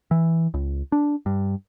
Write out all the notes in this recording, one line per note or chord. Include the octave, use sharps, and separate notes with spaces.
E3
C#2
D4
G2